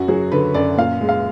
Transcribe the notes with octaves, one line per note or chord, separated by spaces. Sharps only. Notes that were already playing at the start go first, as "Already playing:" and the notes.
Already playing: F#2 F#4
F#3 G#4
D3 B4
F#2 D5
A#2 F5
G#3
F5